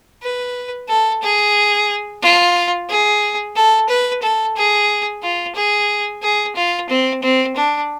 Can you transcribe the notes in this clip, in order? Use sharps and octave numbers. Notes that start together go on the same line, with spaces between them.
B4
A4
G#4
F4
G#4
A4
B4
A4
G#4
F4
G#4
G#4
F4
C4
C4
D4